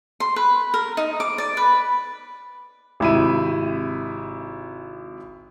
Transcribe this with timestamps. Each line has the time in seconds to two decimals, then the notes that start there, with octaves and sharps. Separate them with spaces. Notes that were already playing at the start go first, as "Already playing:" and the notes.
0.20 C6
0.36 B4
0.74 A#4
0.97 D#4
1.20 D6
1.38 D5
1.57 B4
3.00 G#1 C3 E4 B5 D#7